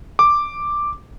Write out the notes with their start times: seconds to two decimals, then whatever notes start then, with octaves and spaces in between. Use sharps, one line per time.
0.19 D6